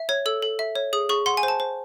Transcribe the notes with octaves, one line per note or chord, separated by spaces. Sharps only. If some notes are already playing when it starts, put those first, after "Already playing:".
Already playing: E5
C#5 G#6
A4 E6
A4
E5
C#5
G#4 D#6
G#4 C#6
F#5 C6
G#5
C5
A5
C5